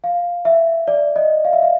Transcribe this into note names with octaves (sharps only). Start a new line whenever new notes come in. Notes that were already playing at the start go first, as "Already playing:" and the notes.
F5
E5
D5
D#5
F5
E5
F5